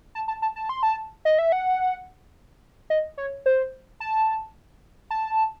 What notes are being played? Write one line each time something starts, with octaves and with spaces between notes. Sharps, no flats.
A5
A5
A5
A5
C6
A5
D#5
E5
F#5
D#5
C#5
C5
A5
A5